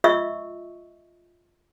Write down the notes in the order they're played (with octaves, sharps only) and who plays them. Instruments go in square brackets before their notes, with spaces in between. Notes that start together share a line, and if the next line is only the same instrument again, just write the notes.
[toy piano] F4 D#5 E5 C#6 E6